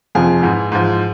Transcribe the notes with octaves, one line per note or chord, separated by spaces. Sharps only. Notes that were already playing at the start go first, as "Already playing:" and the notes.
F2 C3 F3 G#4
G#2 E3
G#2 F3